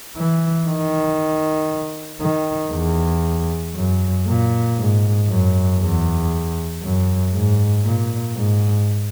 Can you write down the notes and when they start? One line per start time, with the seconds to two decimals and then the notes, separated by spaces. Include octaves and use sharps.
0.17 E3
0.67 D#3
2.21 D#3
2.73 E2
3.75 F#2
4.27 A#2
4.78 G#2
5.28 F#2
5.80 E2
6.82 F#2
7.34 G#2
7.85 A#2
8.36 G#2